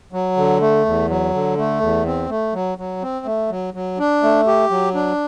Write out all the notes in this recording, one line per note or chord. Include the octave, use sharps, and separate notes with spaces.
F#3
D3
A3
E2
F#3
D3
A3
E2
C4
A3
F#3
F#3
C4
A3
F#3
F#3
D4
A3
G4
F#3
D4